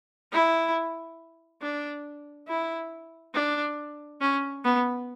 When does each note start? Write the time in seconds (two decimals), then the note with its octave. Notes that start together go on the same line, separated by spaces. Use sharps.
0.33 E4
1.62 D4
2.48 E4
3.34 D4
4.21 C#4
4.65 B3